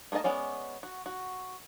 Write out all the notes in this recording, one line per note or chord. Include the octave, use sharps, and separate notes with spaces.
A3 A#3 G#4 D#5 A5
G#3 B3 C#4 D5
F#4
F#4